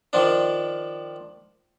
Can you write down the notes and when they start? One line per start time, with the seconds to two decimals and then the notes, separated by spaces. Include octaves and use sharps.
0.13 D#3 F3 D4